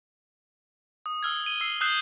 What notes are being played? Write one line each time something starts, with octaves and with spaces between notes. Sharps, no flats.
D#6
E6 F6 G#6
D#7 G7
E6 C7
D#6 E6 F#6 G6 C7 E7